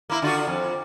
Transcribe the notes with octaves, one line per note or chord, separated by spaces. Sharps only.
A#3 E4
D3 F4 F#4
F2